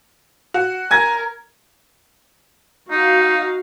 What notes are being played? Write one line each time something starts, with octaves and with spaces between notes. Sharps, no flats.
F#4
A#4 G#5 G#6 A#6
D#4 F#4 F5